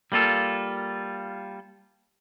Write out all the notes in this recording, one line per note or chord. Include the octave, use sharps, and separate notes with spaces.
G3 A#3 F4 A4